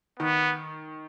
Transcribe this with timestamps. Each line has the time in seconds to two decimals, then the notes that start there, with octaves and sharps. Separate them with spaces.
0.19 D#3 B3